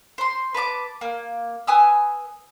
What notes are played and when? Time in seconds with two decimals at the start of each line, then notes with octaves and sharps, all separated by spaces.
0.18 C5 C6
0.54 B4 A5 A#5 D6
1.01 A#3
1.67 B4 G#5 D#6 E6